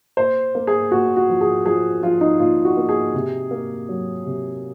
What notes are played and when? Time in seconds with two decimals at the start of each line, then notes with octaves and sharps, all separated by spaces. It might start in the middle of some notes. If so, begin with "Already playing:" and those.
0.17 A#2 C5
0.55 A#3
0.67 G#4
0.91 A#2 F#4
1.17 F#4
1.29 F3
1.41 G#4
1.65 F3 G#4
2.03 F3 F4
2.21 D#4
2.40 A#2 F4
2.65 F#4
2.77 A#3
2.89 G#4
3.14 C3
3.51 A#3
3.89 F#3
4.25 C3